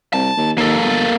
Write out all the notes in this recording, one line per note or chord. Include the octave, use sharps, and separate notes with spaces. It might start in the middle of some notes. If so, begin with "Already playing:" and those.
C2 A5
D#2
D#2 A#3 A4
G1